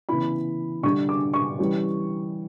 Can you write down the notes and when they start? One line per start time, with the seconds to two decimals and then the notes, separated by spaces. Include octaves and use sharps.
0.09 C#3 E3 B3 E4 B5
0.83 D3 G3 D4 C#6
1.09 D6
1.34 C#6
1.59 E3 G3 C#4